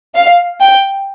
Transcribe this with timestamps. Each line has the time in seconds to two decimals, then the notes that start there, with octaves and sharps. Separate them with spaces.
0.15 F5
0.60 G5